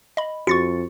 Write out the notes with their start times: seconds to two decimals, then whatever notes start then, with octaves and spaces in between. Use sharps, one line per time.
0.17 D#5 B5
0.47 F2 F#4 C#6 A6 C#7